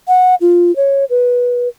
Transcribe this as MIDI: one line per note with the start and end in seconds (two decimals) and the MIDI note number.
0.08 0.35 78
0.41 0.75 65
0.76 1.05 73
1.10 1.68 71